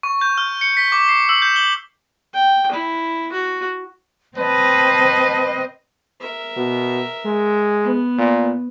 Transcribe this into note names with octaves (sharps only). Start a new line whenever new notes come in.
C#6
G6
F6
C#7
B6
D6
C7
E6
G6
G7
G5
E4
F#4
C4 B4 D#5 A5
A#4 E5
B2
G#3
B3
A#2